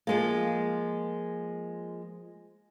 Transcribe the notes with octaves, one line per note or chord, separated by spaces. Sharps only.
F3 G#3 A#3